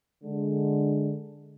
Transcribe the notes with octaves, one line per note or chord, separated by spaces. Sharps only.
D3 G#3